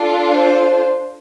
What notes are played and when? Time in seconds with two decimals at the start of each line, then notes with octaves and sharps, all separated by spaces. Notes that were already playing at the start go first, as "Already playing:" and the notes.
Already playing: D4 F4 A4
0.34 C5